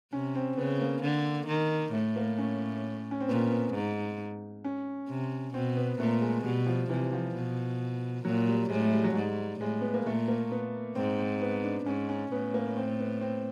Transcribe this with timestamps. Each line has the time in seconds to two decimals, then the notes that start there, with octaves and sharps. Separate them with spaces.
0.12 C3 C#4
0.35 C4
0.57 C#3 B3
0.81 A#3
1.03 D3
1.47 D#3
1.93 A2 A3
2.16 A#3
2.38 C#4
3.11 C#4
3.20 C4
3.28 A#2 B3
3.50 B3
3.74 G#2
4.64 C#4
5.09 C3
5.54 B2 C4
5.77 B3
6.00 A#2 A3
6.21 G#3
6.44 B2 G3
6.66 F3
6.89 C3 E3
7.13 F3
7.35 B2
8.25 A#2 F#3
8.47 G3
8.70 A2 G#3
8.81 A3
8.93 G3
9.04 F#3
9.15 G#2 G3
9.60 A2 G#3
9.81 B3
9.94 A#3
10.06 A#2 A3
10.28 A#3
10.51 B3
10.95 G#2 C4
11.18 C4
11.41 B3
11.64 D4
11.86 G#2 C#4
12.09 C#4
12.32 A2 B3
12.54 A#3
12.77 C4
13.00 B3
13.21 C4